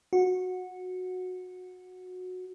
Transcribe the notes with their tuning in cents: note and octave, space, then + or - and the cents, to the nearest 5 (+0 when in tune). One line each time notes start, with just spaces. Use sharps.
F#4 -15